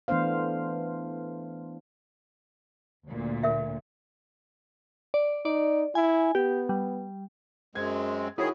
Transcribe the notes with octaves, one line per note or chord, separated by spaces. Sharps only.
E3 A3 B3 D4 C5 F5
D2 A#2
A#4 E5
D5
D#4 D5
E4 G#5
B3 G4
G3
F#2 G#3 C4 G#6
D#3 E4 F#4 G#4 C#5